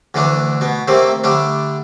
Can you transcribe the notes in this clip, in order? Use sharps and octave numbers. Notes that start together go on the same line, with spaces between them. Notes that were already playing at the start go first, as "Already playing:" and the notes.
D2 D3 E3 A3 D4
B2 B3
C3 D#3 A3 A#3 C4
D3 G3 A3 D4